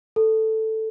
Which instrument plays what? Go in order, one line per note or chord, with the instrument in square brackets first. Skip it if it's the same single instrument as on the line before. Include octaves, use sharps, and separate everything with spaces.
[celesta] A4